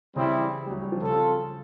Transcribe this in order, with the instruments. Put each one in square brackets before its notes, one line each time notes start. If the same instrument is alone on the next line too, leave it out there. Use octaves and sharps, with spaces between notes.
[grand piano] C#3 [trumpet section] G3 C4 E4
[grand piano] E3
G3
F#3
G3
F3
[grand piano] C#3 [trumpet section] C4 F4 A4